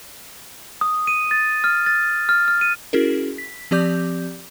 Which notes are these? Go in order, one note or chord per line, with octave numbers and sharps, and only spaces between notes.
D#6
D#7
A6
F6
A6
F6
F6
D#7
C#4 E4 F#4 G#4 A#4
B6
F3 C4 G4 D5 D6 G6